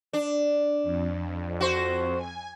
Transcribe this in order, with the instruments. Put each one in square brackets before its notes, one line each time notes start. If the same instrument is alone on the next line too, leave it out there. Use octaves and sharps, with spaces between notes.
[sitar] D4
[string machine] F2
[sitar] F#4 C5
[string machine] G#5